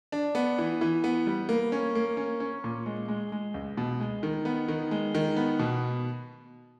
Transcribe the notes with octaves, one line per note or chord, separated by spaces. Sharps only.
D4
B3
E3
E3
B3
G3
A#3
C#4
A#3
C#4
C#4
A#2
G#3
G#3
G#3
C#2
B2
G#3
D#3
B3
D#3
G#3
D#3
B3
B2